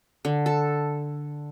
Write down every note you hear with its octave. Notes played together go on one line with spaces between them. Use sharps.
D3
A4